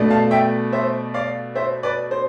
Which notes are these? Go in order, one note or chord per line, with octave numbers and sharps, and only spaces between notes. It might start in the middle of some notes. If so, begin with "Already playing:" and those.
Already playing: B2 A3 D4
F5 A5
E5 G5
C5 E5
D5 F5
C5 E5
B4 D5
C5